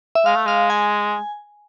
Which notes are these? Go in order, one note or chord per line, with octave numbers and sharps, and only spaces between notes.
E5
G#3 F5
A3
G#3 F5
G#5